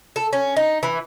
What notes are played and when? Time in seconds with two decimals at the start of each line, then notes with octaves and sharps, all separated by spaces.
0.16 A4
0.33 C#4
0.56 D#4
0.83 E3